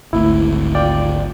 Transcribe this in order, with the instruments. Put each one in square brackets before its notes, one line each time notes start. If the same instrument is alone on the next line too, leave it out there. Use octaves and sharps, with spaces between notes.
[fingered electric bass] G#1 D2 A3 [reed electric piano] E4
[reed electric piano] F4 D5 G5